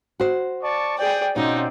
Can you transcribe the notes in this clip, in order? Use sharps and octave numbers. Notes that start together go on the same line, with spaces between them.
F#4 C5
D5 A5 C#6
G#4 D5 G5
B2 C4 C#4 D#4 F4 D5